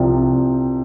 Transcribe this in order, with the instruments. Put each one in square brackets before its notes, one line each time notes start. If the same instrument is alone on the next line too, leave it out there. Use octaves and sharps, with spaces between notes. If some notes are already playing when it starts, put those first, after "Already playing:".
Already playing: [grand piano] C2 C3 F3